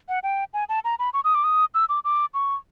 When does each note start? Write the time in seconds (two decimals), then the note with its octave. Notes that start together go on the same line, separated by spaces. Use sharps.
0.09 F#5
0.23 G5
0.54 G#5
0.69 A5
0.84 A#5
0.99 B5
1.14 C#6
1.24 D#6
1.35 D6
1.44 D#6
1.74 E6
1.89 D6
2.05 D6
2.34 C#6